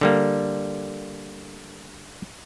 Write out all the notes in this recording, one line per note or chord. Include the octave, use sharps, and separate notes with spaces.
D3 G3 A#3